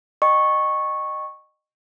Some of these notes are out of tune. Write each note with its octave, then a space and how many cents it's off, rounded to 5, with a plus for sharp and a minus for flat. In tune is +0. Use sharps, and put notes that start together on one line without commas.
D#5 -25 G5 +0 C#6 -10